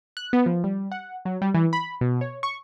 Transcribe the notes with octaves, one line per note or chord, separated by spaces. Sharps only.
F#6
B3
F3
G3
F#5
F#3
G3
E3
B5
B2
C#5
C#6